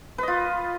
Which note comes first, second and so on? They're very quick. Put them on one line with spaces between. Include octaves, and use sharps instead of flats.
B4 D#5 F4